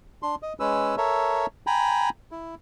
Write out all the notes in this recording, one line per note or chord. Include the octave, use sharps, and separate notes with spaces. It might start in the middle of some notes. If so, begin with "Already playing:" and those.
D4 C6
D#5
G#3 C#4 B4 E6
A4 A#4 C#5 E5
G5 G#5 A#5 B5
E4